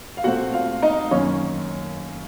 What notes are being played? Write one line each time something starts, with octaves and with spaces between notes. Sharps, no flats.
F5
A#2 A3 C4 F#4 F#5
F4 F5
D#4 D#5
F#2 D#3 A#3 C#4 C#5